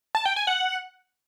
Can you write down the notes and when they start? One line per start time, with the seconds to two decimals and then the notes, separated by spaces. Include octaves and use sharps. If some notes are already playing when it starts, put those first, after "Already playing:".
0.15 A5
0.25 G5
0.36 G#5
0.47 F#5